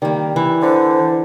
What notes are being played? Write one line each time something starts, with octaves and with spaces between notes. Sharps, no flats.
D#3 G3 A#3
E3
D3 C5